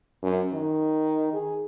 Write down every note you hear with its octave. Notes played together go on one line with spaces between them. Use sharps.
F#2
D#3
G#4